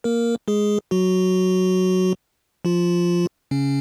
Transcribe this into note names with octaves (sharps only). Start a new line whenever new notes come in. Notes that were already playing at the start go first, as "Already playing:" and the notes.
A#3 A#4
G#3 G#4
F#3 F#4
F3 F4
C#3 C#4